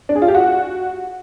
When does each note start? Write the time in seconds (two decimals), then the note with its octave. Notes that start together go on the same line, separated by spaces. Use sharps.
0.09 D4
0.15 G#4
0.22 F4
0.28 G4
0.35 F#4